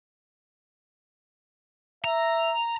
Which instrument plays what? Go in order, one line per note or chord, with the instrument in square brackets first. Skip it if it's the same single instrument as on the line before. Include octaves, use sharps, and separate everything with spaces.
[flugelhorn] E5 [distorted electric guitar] A#5